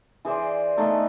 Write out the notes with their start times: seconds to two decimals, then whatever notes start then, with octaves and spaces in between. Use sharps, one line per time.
0.25 E3 G#4 C5 D5
0.77 A3 B3 D#4 A4